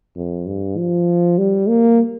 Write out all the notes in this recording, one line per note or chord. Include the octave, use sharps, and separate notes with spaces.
F2
G2
F3
G3
A#3